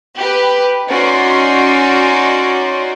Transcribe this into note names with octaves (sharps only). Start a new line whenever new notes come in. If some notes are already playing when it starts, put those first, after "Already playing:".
G4 B4
C#4 D#4 F#4 D5 C6